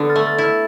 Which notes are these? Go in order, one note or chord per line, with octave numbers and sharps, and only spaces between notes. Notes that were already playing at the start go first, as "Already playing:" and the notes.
Already playing: D3 B3
F6 A6
A3
F6 A6
E4 F6